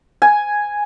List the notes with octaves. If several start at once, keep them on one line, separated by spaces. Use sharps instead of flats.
G#5